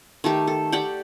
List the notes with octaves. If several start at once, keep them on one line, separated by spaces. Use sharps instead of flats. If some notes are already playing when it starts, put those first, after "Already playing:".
D#3 A3 G4
A4
G4 D5 F#5 G5